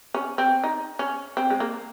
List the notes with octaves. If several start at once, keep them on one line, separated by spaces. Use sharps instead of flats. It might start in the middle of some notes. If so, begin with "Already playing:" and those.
C#4
C4
D#4
C#4
C4
G#3
A#3